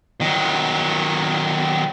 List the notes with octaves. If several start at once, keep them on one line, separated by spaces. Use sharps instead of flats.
D#3 F#3